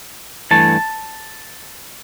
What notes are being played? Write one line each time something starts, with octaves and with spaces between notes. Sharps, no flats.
G2 E3 A3 A5